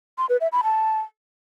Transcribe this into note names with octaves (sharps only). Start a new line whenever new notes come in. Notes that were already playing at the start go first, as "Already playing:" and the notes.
C6
B4
E5
B5
A5